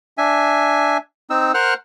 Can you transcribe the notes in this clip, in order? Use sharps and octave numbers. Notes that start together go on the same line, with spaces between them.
D4 E5 G#5
C4 D#4 E6
A#4 C5 F#5 F6 F#6